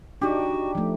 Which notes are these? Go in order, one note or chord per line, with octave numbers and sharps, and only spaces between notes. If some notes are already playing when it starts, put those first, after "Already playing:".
D4 D#4 F#4 G4
F3 A3